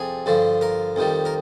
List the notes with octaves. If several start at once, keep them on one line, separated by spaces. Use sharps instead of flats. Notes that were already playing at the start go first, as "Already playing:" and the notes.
Already playing: F2 C3 G3 G#4
G2 D3 F3
A#4
F2 D#3 G3
A#4